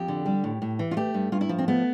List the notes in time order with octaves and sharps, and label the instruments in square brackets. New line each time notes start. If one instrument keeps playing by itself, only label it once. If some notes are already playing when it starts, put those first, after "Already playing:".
Already playing: [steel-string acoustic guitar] F2 G4
D3
G3
A2
A2
E3
F4
A3 G4
G2
G2 F4
E4
F3
C4
A3 B3